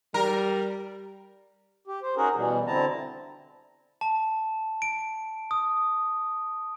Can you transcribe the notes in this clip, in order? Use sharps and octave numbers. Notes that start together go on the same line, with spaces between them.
G3 A#4
G4
C5
C#4 D#4 F#4 G#4 A#4
B2 E3 G3
D3 C4 E4 A5 A#5
A5
D7
D#6